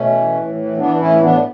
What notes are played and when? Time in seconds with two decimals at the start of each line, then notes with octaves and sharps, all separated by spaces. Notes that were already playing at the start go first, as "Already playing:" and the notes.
Already playing: B2 A3 C#4
0.12 E3
0.33 A2
0.55 E3
0.77 E3 B3 D4
0.99 A2 C#4 E4
1.21 A2 B3 D4